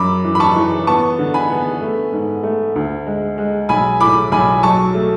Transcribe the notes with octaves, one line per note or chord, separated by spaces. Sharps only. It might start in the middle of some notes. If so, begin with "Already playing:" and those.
Already playing: F#2 B5 D6
E3
B5
A5 C#6
E3
B3 A5 C#6
D3
G#5 B5
B3
A3
G#2
A3
D2
G#3
G#3
B1 G#5 B5
A2 B5 D6
B1 G#5 B5
F#3 A5 C#6
A3